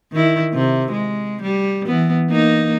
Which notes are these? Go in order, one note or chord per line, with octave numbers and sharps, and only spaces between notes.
D#3 E4
C3
G#3
G3
E3 B3
A#3 D#4